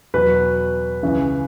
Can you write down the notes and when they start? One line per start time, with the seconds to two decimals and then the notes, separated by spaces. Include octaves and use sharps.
0.14 E2 B2 F#3 B4
1.03 C#2 C#3 E3